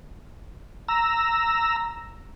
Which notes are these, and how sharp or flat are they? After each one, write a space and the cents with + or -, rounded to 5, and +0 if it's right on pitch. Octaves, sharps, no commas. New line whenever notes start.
A#5 +0 E6 +0